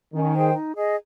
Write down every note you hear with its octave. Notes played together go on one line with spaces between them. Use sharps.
D#3 C#4
G#4 C5 G5
D#4
G#4 D#5